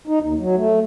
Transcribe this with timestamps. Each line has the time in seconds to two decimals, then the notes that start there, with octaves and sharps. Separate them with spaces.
0.08 D#4
0.22 D#2
0.39 F#3
0.56 A3